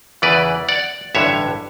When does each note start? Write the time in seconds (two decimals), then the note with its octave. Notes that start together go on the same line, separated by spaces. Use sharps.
0.22 E2 C#3 E3 B4 D5
0.69 D5 F#5
1.15 A1 G2 D3 C#5 E5